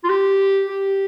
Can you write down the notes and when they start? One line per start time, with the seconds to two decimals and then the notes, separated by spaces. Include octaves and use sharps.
0.04 F4
0.10 G4
0.68 G4